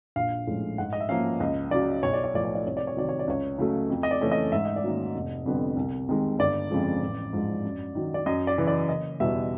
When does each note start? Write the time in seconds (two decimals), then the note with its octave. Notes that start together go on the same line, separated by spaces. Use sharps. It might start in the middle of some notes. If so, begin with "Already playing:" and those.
0.16 A#1 F5
0.47 A2 F3 G#3 C#4
0.78 G#2 F#5
0.93 D#5
1.00 E5
1.09 F3 A#3 C#4 F5
1.40 C#2 D#5
1.71 C#3 F#3 D5
2.03 B1 C#5
2.13 D5
2.24 C#5
2.34 A2 F3 D5
2.45 C#5
2.55 D5
2.66 C2 C#5
2.77 D5
2.87 C#5
2.97 C3 D#3 F#3 D5
3.09 C#5
3.19 D5
3.28 C#2 C#5
3.58 C#3 F#3 A3
3.90 F2
4.03 D#5
4.11 D5
4.21 C#3 E3 A3 C#4
4.31 D#5
4.52 G#2 E5
4.65 D#5
4.76 D5
4.84 D#3 F#3 A#3 C#4 D#5
5.15 F1
5.46 F2 D3 G3 B3
5.76 C2
6.09 C3 D#3 G#3
6.39 G1 D5
6.71 F2 C#3 F3 G#3
7.02 A1
7.33 G#2 F3 G#3
7.64 F#2
7.95 D#3 F#3
8.14 D5
8.26 F#2 D#5
8.47 D5
8.58 C#3 E3
8.67 D5
8.89 F#1 D#5
9.20 E2 B2 G3 E5